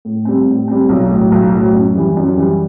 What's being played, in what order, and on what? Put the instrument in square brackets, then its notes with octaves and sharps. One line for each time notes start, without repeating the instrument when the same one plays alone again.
[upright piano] A2
G3 C4
A2
G3 C4
B1
A2 F#3
B1
A2 F#3
F#2
E3 G3
F#2
E3 G3